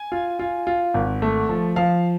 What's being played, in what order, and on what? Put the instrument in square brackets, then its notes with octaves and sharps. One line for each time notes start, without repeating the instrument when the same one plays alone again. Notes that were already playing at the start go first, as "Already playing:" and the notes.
Already playing: [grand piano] G#5
F4
F4
F4
G#1
A3
F3
F3 F5